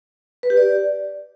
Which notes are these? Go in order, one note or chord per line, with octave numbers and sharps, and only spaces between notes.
B4
G4
D5